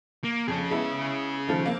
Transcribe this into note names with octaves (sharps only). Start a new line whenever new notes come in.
A#3
F2 C#4 G#4
G#3 B3 E4
D#3 F3 A3
A#3 C4